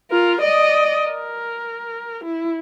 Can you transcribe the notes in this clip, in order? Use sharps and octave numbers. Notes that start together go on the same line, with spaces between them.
F4 A#4
D5 D#5
A#4
E4